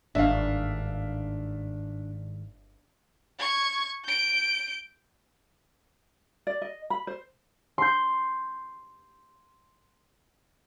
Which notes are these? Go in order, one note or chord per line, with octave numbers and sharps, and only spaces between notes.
G1 G#2 D#3 A#3 D4 E5 F5
C#6 G#6
G6 D7
D5
D#5
B5
C5
C6 G6